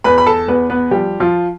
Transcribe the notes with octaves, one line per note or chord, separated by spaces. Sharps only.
E2 B4 B5
B5
A4 A5
E2 B3 B4
B3 B4
F3 G3 G4
F3 F4